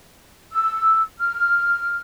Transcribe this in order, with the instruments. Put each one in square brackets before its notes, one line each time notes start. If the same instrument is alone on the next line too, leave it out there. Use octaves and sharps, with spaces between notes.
[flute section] E6
F6